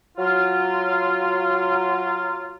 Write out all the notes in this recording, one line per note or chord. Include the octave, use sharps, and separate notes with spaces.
F#3 F4